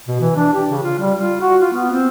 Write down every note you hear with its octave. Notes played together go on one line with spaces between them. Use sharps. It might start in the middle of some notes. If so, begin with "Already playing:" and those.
B2
E3
D4
G4
C#3
F4
G3
F4
F#4
F4
B3
C4